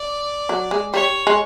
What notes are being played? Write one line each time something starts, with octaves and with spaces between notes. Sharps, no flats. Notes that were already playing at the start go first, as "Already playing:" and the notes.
Already playing: D5
F#3
G#3
G3 C#5
G#3